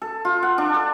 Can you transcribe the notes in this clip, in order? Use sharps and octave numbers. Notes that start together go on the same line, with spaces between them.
A4
F4
F#5
D4
A4